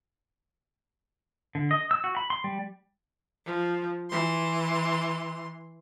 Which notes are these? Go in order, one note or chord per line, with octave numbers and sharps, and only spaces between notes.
D3
D#5
E6
F#4
B5
C6
G3
F3
E3 C6